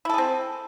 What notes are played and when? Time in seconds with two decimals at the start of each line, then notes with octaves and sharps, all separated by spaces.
0.05 E4
0.09 A4
0.14 G#4
0.18 C4